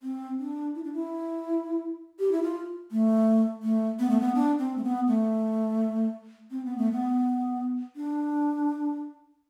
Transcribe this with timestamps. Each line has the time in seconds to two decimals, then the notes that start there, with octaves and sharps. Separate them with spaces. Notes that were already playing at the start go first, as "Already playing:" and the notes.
0.03 C4
0.39 D4
0.75 E4
0.84 D4
0.93 E4
2.19 G4
2.32 E4
2.43 F4
2.92 A3
3.63 A3
3.99 B3
4.10 A3
4.20 B3
4.35 D4
4.59 C4
4.77 A3
4.84 B3
5.07 A3
6.51 C4
6.65 B3
6.78 A3
6.92 B3
7.96 D4